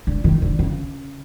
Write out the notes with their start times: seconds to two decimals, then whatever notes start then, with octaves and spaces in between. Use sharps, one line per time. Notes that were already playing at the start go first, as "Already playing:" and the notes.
0.07 D3
0.24 D#3
0.42 D3
0.59 C#3